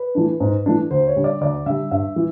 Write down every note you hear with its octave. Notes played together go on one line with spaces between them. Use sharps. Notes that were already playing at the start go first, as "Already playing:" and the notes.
Already playing: B4
E3 A3 D4
G#2
E3 A3 D4
D2 C5
C#5
D3 G3
D5
D2 D5
D3 G3 E5
G2 E5
E3